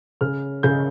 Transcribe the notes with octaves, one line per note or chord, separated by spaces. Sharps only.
C#3 F6
C#3 G6